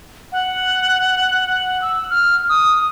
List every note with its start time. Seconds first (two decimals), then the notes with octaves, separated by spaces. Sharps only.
0.32 F#5
1.82 E6
2.10 F6
2.49 D#6